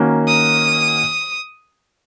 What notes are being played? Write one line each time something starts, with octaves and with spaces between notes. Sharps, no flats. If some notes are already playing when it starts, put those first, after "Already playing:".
Already playing: D#3 A#3 C#4 F#4
D#6